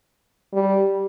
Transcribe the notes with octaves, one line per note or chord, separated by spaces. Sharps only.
G3